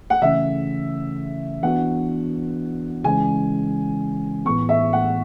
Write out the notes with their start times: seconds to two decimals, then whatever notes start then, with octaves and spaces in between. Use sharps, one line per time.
0.10 F#5
0.22 C#3 E3 A3 C#4 E5
1.63 E3 B3 D4 F#4 F#5
3.04 C#3 E3 G#3 C#4 G#5
4.46 A2 E3 B3 C#6
4.69 E5
4.93 F#5